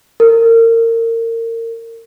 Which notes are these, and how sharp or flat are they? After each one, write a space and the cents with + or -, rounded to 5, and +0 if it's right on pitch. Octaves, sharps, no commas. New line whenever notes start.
A#4 -30